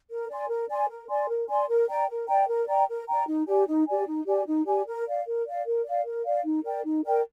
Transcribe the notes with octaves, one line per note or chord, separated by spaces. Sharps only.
A#4
D5 G#5 C6
A#4
D5 G#5 C6
A#4
D5 G#5 C6
A#4
D5 G#5 C6
A#4
D5 G5 A#5
A#4
D5 G5 A#5
A#4
D5 G5 A#5
A#4
D5 G5 A#5
D#4
G4 D5 G#5
D#4
G4 D5 G#5
D#4
G4 D5 G#5
D#4
G4 D5 G#5
A#4
D5 F5
A#4
D5 F5
A#4
D5 F5
A#4
D5 F5
D#4
A#4 D5 G5
D#4
A#4 D5 G5